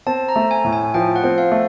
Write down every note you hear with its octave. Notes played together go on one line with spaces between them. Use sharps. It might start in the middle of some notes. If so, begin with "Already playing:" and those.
C4 A5
A#5
A3
G#5
A2
G#5
F3 G5
F#5
C4
F5
A3